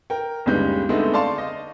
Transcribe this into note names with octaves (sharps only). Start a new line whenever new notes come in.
A#4 G5
G1 D#2 C#3 G3 G#3 G6
D3 G#3 A3 B3 C4 D#4
D5 F5 A5 C6 C#6
D#5